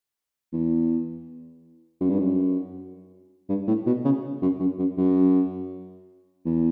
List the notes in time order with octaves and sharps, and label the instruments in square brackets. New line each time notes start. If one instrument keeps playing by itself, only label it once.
[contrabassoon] E2
F#2
G2
F#2
G2
A2
B2
C#3
F#2
F#2
F#2
F#2
E2